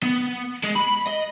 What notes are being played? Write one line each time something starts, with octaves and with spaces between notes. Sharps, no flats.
B3
G#3
B5
D#5